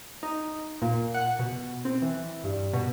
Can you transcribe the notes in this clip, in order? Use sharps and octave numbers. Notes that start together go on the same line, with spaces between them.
D#4
A#2
F#5
B2
C4
E3
G2
B2